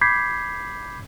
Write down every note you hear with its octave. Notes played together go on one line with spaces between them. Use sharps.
B5 D6 G6 G#6 B6 C7